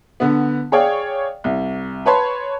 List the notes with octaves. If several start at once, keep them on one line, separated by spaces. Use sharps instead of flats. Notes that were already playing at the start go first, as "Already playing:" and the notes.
D3 B3
G#4 C#5 D5 F5 G5
C2
B4 C#5 A5 B5 C6